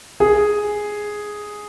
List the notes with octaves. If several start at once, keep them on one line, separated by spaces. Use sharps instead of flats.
G#4